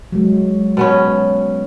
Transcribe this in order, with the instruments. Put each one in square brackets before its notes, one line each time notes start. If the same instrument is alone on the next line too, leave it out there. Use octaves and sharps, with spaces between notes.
[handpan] F#3 G#3
[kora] B2 B3 C#4